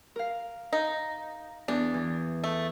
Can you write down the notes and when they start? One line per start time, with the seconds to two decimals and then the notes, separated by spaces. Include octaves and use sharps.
0.16 A#4 F5
0.73 D#4
1.68 E2 D4
1.94 E3
2.44 A3